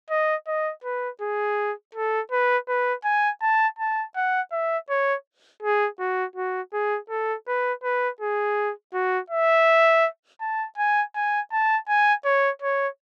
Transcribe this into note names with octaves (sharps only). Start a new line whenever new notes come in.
D#5
D#5
B4
G#4
A4
B4
B4
G#5
A5
A5
F#5
E5
C#5
G#4
F#4
F#4
G#4
A4
B4
B4
G#4
F#4
E5
A5
G#5
G#5
A5
G#5
C#5
C#5